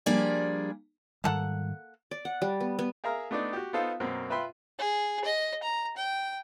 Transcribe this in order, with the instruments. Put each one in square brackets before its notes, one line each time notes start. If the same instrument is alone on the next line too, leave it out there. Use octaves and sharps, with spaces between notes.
[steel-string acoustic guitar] F3 G3 A#3 D4 G#4 D5
[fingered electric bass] G#2 D#3 G3 [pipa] A#3 A4 F#5
[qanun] D5
F#5
G3
B3
B3
[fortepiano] G#4 A#4 E5 F5 A#5 F6
A3 B3 D4 D#4 D5
F#4 G4
B3 D#4 F4 A4 C5 F5
F#2 B2 A#3 C4
F4 B4 E5 G5 B5 C6
[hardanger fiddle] G#4
D#5
A#5
G5